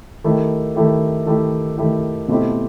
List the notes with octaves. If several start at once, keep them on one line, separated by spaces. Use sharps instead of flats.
D#3 A3 E4 G4
D#3 A3 E4 G4
D#3 A3 E4 G4
D#3 A3 E4 G4
B2 A3 C4 E4 G4